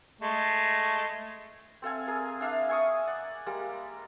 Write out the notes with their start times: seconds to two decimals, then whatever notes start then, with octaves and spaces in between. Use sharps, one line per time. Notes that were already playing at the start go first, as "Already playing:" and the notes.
0.21 G#3 A3
1.82 C4 A4 F5 G#5
2.06 G#4 A#4
2.41 D4 E5 F5
2.68 E5 G#5 C#6 D#6
3.07 D5 F#5
3.46 G3 G#3 A#3 A#5